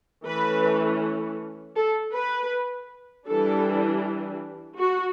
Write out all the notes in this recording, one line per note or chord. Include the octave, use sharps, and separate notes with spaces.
E3 A3 C#4 B4
A4
B4
E3 G3 D4 A4
F#4